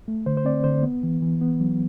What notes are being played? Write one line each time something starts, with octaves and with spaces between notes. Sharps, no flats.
A3
D3 C5
C5
C4 D5
D3 C5
B3
E3
E3
B3
F#3